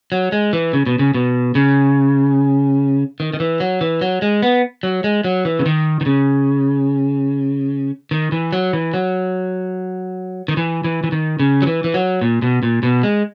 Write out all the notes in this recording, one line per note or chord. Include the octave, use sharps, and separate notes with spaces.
F#3
G#3
E3
C#3
B2
C#3
B2
C#3
D#3
D#3
E3
F#3
E3
F#3
G#3
B3
F#3
G#3
F#3
E3
C#3
D#3
D#3
C#3
D#3
E3
F#3
E3
F#3
D#3
E3
E3
E3
D#3
C#3
F#3
E3
E3
F#3
A#2
B2
A#2
B2
G#3